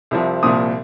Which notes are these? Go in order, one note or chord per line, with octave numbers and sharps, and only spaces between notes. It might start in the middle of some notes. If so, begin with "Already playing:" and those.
C2 C3 F3
C2 A#2 F3 D#6